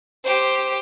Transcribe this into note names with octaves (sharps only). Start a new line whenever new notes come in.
G4 C5